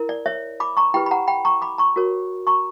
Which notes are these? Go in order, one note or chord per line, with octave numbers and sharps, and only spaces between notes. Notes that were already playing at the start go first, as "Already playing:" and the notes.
Already playing: E4 A#4
D5
C#5 E5
B5 D6
A#5 C#6
E4 G4 B4 G5 B5
B5
F#5 A#5
G5 B5
A#5 C#6
B5 D6
A#5 C#6
F#4 A#4 C#5
A#5 C#6